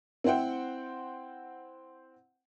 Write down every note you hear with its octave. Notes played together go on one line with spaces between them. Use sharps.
C4 E4 C5 F#5 G5